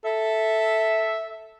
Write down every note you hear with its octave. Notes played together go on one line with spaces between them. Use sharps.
A4 E5